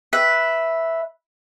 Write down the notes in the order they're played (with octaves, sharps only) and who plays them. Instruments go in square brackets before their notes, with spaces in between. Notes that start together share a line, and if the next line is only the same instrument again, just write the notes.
[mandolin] B4 E5